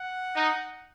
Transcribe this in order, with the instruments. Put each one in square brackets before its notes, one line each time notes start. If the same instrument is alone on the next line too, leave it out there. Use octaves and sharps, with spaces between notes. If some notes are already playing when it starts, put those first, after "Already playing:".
Already playing: [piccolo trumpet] F#5
[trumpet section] D#4